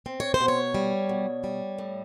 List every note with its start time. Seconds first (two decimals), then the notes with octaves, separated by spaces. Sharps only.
0.06 C4
0.20 C#5
0.34 C5
0.40 B2
0.48 C#5
0.75 G3
1.09 B2
1.44 G3
1.78 A2